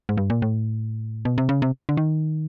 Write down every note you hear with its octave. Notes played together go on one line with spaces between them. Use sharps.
G#2
G2
A#2
A2
B2
C3
C#3
C3
D3
D#3